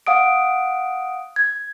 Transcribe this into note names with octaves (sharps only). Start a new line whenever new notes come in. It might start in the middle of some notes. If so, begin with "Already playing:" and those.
F5 F#5 D#6 D7
G#6